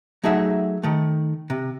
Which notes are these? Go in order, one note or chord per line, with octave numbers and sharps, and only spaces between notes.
F#3 A3 D#4 G#4 E5 F#5
D#3 A3
C3